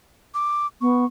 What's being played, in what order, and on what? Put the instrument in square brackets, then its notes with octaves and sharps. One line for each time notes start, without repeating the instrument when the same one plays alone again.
[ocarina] D6
[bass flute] B3 [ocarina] C#6